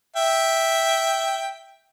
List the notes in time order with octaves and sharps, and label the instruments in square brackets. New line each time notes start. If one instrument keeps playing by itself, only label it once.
[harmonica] E5 G5